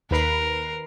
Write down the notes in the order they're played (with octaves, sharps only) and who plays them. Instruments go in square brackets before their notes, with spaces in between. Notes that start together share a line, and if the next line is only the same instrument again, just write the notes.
[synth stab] D#2 B4 C7 [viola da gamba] A#4